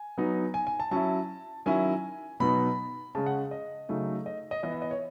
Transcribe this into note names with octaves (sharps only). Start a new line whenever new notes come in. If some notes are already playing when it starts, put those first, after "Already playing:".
Already playing: G#5
F#3 B3 D#4
G#5
G#5
A5
F#3 C#4 E4 A5
D#3 F#3 C#4 E4 G#5
B2 F#3 B3 D#4 B5
C#3 G#3 C#4 A5
F#5
D#5
C#3 F#3 A3 D#4
D#5
D#5
E3 B3 E4 D#5
E5
D#5
C#5